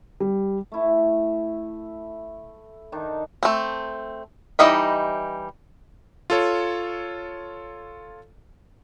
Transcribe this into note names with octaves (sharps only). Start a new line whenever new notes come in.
G3
A3 E4
D#3 D4 D#4
A3 C4
E3 G3 D#4 D#5 E5
F4 A4 C#5